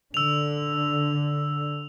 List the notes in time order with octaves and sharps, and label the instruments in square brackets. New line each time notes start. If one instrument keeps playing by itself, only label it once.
[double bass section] D3 [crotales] E6 F7